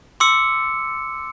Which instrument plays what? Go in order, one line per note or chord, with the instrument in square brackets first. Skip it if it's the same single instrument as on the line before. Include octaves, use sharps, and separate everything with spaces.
[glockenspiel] C6 D6 E6 C#7